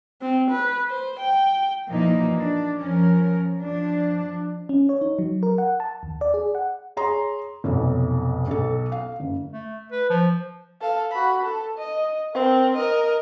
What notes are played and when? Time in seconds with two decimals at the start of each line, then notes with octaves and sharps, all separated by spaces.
0.22 C4
0.51 B4
0.90 C5
1.20 G5
1.89 A#2 E3 F3 A#3 D#4 E4
2.38 D4
2.80 F3 C#4 A#4
3.60 F3 D4
4.69 C#4
4.89 C#5
5.01 D#4
5.19 F#3
5.43 A#4
5.58 F#5
5.80 A5
6.03 D#2
6.21 D5
6.34 G#4
6.55 F#5
6.97 G#4 C#5 A#5 C6
7.64 F1 B1 B2 C#5
8.48 B1 A4
8.92 F5
9.20 F#1
9.53 A3
9.92 B4
10.10 F3
10.81 A4 F5
11.12 F#4 B5
11.43 A4
11.78 D#5
12.34 C4 A#4
12.76 A#4 D#5